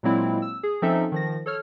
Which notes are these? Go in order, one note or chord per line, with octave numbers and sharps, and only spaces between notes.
A#2 F#3 G#3 A#3 C4 E4
E6
G#4
F3 C4 C#4 D#4 A4 E5
D#3 F3 A#6
A4 C#5 F6